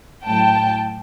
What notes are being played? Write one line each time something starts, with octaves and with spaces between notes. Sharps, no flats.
A2 F#3 G5 A5